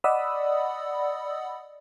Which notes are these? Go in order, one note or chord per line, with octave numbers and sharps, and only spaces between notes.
D5 D#5 F#5 B5 D#6 E6